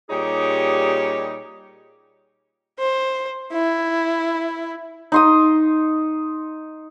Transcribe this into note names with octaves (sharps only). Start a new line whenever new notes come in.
A#2 G3 D#4 G4 G#4 C#5
C5
E4
D#4 C6 D#6